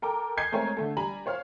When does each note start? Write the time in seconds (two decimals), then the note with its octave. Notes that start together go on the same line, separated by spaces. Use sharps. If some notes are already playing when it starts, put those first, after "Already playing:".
0.02 A4 A#4 G5 D6
0.37 D#5 G#5 G6 G#6 C7
0.52 G#3 A3 C4 A#4 C#5 G#5
0.77 D3 A3 A4
0.97 G3 G#5 A#5 B5 F#7
1.26 C5 C#5 F5 F6